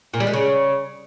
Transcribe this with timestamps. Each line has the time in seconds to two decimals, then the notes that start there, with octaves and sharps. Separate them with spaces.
0.14 A#2
0.20 G3
0.27 G#3
0.33 C#3